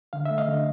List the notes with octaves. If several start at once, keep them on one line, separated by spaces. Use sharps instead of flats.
D3 F5
A3 E5
D#5 F5
D3